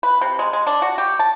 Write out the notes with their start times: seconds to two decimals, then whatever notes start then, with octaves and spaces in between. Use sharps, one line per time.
0.03 B4
0.21 C3
0.39 G#3
0.53 G#3
0.67 D4
0.82 F#4
0.98 G4
1.19 A5